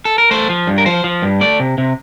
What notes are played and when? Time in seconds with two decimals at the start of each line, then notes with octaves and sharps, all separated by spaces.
0.05 A4
0.18 A#4
0.31 A3 C5
0.49 F3
0.67 G2
0.78 A#4
0.86 F3 C5
1.04 F3
1.22 G2
1.41 A3 D5
1.60 C3
1.78 C3